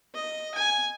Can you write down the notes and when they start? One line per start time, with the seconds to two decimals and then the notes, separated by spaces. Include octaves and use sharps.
0.14 D#5
0.55 G#5